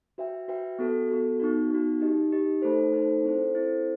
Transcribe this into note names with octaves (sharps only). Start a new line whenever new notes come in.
F#4 B4 E5 G5
F#4 B4 E5 G5
B3 F#4 A4
B3 F#4 A4
B3 D#4 F#4
B3 D#4 F#4
D#4 G4 D#5
D#4 G4 D#5
A3 D#4 A4 C5
A3 D#4 A4 C5
C4 E4 A4 C5
C4 E4 A4 C5